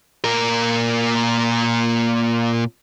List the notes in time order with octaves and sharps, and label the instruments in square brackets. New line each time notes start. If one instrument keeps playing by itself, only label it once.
[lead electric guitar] A#2 A#4